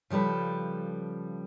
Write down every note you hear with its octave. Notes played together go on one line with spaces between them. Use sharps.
C#3 F3 G3 A4 B4